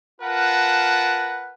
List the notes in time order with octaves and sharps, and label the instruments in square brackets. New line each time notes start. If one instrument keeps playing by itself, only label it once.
[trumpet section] F4 A#4 B4 F#5 A5